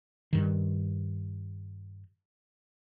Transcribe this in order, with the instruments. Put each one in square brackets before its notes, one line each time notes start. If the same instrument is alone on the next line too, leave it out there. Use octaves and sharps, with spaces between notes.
[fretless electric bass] G2 D#3